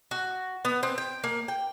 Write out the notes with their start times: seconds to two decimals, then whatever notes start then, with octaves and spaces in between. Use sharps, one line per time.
0.11 F#4
0.65 B3
0.83 C4
0.98 G5
1.24 A#3
1.48 G5